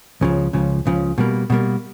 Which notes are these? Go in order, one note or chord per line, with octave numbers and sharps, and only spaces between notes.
C#2 C#3 F3
C#2 C#3 F3
C#2 C#3 F3
B2 G3 A#3
B2 G3 A#3